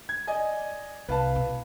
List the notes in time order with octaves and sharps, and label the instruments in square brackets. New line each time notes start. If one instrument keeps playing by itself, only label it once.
[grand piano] G#6
D5 D#5 G#5
[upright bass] C2 [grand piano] B4 F5 A5
[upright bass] B2